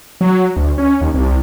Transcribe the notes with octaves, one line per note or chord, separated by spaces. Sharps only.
F#3
D2
C#4
D#2
C2